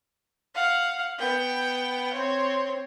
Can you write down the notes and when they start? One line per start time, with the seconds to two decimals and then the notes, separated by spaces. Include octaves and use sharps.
0.55 F5 F#5
1.19 B3 G5
2.13 C4 C#5